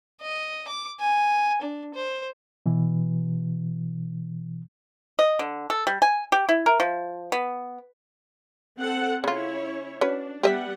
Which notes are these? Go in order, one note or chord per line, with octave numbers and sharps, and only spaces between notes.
D#5
D6
G#5
D4
C5
B2 E3
D#5
D3
A4
G3
G#5
G4
E4
A#4
F3
B3
C4 A4 F#5
C#3 C#4 E4 F4 C#5
C#4 D4 F#4 B4
G3 B3 G4 D#5 E5 F#5